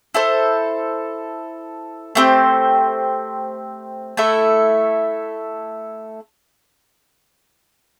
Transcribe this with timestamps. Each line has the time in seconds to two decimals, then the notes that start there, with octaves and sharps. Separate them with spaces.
0.14 E4 A4 C5
2.15 A3 C4 G4 C5
4.17 A3 E4 A4 E5